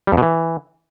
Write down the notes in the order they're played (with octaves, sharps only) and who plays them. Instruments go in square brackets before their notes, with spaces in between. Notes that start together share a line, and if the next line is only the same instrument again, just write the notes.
[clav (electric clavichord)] G3
F2
B2
E3